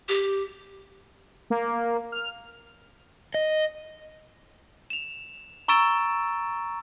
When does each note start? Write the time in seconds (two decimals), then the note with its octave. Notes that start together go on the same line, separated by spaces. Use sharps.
0.09 G4
1.50 A#3
2.12 F6
3.34 D#5
4.90 E7 F7
5.68 A#5 C#6 E6 A6 D7 E7